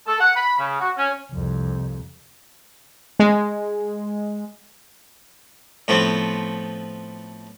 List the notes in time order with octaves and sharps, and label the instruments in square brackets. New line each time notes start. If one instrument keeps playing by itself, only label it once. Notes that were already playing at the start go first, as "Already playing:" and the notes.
[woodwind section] A4
F#5
B5
C#3
F#4
C#4
[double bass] C2 F2
[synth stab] G#3
[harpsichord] A2 F3 B3 C4